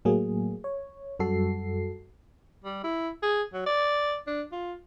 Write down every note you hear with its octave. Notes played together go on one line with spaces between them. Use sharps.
A2 F#3 A3 A#3 G#4
C#5
F#2 G3 F#4 A4 C7
G3
E4
G#4
F#3
D5
D4
F4